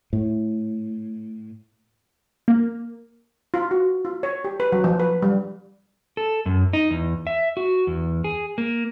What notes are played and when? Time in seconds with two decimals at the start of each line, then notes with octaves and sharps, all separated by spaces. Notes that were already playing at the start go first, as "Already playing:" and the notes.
0.13 A2
2.48 A#3
3.54 F4
3.71 F#4
4.05 F4
4.23 C#5
4.45 G4
4.60 B4
4.72 F#3
4.84 F3
5.00 B4
5.22 G3
6.17 A4
6.46 F#2
6.73 D#4
6.91 E2
7.27 E5
7.57 F#4
7.87 E2
8.24 G#4
8.58 A#3